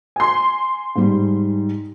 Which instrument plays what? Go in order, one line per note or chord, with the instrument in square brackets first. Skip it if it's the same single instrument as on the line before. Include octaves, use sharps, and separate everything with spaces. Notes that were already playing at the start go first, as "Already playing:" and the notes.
[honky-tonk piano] G#5 C6
[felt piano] G#2 G3